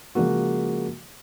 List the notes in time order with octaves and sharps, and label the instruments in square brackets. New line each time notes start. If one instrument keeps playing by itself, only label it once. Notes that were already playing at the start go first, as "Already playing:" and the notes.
[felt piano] C#3 F3 G#3 A#3 F#4